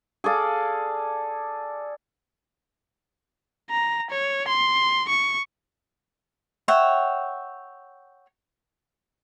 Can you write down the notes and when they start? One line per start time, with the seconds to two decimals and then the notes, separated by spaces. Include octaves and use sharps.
0.24 G#4 A4 D5 F5
3.70 A#5
4.10 C#5
4.48 C6
5.09 C#6
6.68 C#5 E5 F#5 G5